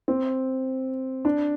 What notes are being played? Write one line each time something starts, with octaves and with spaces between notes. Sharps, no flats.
C4
D4